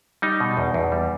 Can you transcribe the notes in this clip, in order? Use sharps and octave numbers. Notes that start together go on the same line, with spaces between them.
G3 D#4
B2
E2
E2
G3